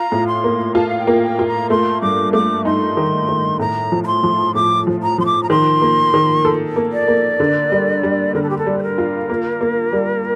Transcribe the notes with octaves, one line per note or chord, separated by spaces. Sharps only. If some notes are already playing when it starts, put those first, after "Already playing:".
Already playing: F4 A#5
A2
C6
A#3
F4 A5
F5
G5
A#3
G5
F4
A#5
A3 C6
G2 D6
A3 D6
D#4 C6
D#3
D#3
A2 A#5
F3
A#5
C6
F3
A2 D6
F3
A#5
F3 C6
D6
A#5
D#3 C6
A#3
D#3
A4
A#3
D5
A#3
D3
G3
G3
D3 A#4
A4
G4
A4
G3
C5
A#4
F4
A#3
A#3
G3